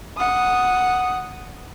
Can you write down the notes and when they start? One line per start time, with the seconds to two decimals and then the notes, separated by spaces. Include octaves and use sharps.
0.17 F#5 D#6